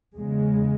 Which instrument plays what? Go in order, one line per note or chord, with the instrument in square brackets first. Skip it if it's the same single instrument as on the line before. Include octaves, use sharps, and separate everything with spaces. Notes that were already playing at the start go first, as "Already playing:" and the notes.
[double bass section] E2 C#3 G#3